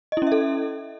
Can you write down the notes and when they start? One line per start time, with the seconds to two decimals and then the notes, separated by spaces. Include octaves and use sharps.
0.12 D#5
0.17 E4
0.22 C#4
0.27 E5
0.32 A4